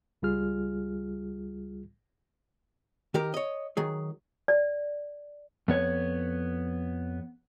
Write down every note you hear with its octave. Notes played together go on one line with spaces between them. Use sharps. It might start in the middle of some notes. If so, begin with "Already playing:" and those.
C#2 G3 F4 G#4 F6
D#3 G4 A#4
C#5 D#5
D#3 F#3 G#4
D5
F2 B3 C#5